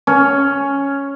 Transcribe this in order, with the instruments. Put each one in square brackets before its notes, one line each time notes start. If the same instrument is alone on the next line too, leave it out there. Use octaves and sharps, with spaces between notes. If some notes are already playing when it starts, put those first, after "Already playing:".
[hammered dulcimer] C#4